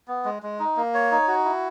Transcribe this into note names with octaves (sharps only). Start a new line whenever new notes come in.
B3
G#3
G#3
D#4
A#3
C#5
D#4
F#4
E4